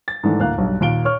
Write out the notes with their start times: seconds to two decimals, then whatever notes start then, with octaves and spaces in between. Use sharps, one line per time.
0.08 A6
0.23 G#2 D#3 E3 A3 D4
0.39 D2 A2 A#3 F5 F#6
0.58 B1 G2
0.80 D#2 A#2 F5 D7 G7
1.05 C#5 C#6 F6